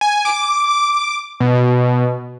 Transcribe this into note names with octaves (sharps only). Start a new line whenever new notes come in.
G#5
D6
B2